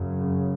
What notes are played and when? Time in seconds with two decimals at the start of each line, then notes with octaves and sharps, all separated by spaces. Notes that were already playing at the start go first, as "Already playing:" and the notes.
Already playing: F#2 C#3